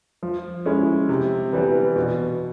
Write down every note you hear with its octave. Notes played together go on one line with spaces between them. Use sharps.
F3
G#3 C#4 E4
C3
E3 G3 B3
B2